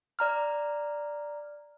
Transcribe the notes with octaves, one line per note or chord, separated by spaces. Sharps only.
D5 A#5 F6